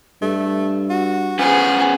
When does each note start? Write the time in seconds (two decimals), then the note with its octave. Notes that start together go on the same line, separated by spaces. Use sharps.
0.22 G2 A3
0.90 F#4
1.39 F3 C#4 G#4 B4 F#5